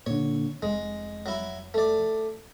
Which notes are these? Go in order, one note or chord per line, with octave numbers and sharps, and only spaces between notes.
A#2 D3 C#5
F1 G#3
F#3 E4
A3 D5